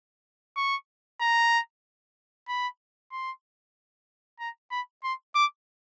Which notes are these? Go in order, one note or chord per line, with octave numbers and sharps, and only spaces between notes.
C#6
A#5
B5
C6
A#5
B5
C6
D6